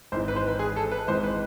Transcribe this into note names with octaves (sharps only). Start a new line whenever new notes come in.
G#1 G#2 E3 C5
B4
C5
B4
G#4
A4
B4
G#1 G#2 E3 C5
B4